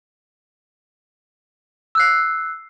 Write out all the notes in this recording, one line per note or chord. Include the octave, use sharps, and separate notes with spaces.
E6 F#6 C7